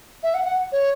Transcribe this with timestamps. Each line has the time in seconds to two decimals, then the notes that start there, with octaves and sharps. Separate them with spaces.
0.23 E5
0.34 F#5
0.45 F#5
0.72 C#5